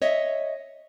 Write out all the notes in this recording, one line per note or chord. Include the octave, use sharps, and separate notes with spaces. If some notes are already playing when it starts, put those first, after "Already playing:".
C#5 D#5 E5